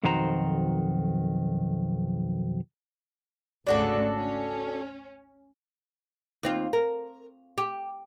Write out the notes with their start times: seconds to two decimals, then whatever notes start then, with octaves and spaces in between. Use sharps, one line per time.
0.03 B1 F2 D#3 F#4 C5 A#5
3.67 G#1 D2 C#3 D4 F#4 A4
4.16 C#4
6.43 D#2 C4 F4
6.73 A#4
7.58 G4